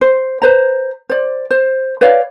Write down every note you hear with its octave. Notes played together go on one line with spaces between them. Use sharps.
C5
B4 C5 A#5
C5 D5
C5
B4 C#5 D5 F5